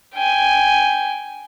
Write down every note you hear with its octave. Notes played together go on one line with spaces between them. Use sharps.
G5 G#5